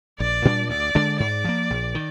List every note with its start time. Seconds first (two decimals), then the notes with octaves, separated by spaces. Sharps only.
0.20 A#1 D5
0.45 A#2 G3 D4
0.69 D2 D5
0.95 D3 G#3 D4
1.20 G#2 D5
1.44 F3 A#3
1.70 A#1
1.95 D#3